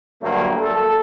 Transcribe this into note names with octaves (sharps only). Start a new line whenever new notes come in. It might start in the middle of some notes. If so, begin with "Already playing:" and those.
D2 G2 F#3 A3 A#3
A4